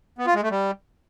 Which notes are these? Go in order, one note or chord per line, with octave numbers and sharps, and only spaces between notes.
B3
F4
G#3
A3
G3